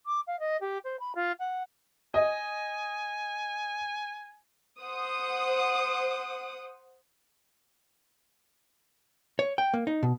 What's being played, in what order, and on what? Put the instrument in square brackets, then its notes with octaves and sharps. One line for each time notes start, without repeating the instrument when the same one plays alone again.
[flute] D6
F5
D#5
G4
C5
B5
F4
F#5
[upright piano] D#5 [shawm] G#5
[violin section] C5 F#5 D#6
[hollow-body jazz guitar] C#5
G5
A#3
D#4
B2